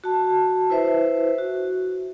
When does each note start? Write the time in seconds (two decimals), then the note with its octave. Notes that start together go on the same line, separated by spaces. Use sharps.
0.04 F#4 A5
0.70 E4 B4 C5 E5
1.38 F#4